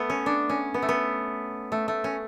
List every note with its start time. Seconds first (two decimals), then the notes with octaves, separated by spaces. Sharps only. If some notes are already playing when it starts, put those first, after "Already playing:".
Already playing: A3 B3
0.10 C#4
0.26 D4
0.50 C#4
0.74 B3
0.82 A3
0.89 B3
1.72 A3
1.88 A3
2.04 C#4